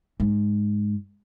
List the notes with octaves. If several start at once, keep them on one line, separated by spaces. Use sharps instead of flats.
G#2